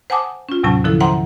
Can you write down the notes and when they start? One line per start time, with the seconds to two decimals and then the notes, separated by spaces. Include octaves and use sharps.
0.10 C5 F#5 G#5 A5 D6 D#6
0.49 C#4 F4
0.63 D#2 A2 C3 F#3 C#4 A5
0.84 D3 F3 E4 A4
1.00 C5 E5 F#5 G5 A#5 C6